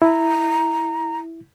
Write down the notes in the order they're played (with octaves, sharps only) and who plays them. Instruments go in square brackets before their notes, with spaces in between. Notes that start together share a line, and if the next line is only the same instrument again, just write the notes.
[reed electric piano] E4 [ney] A#5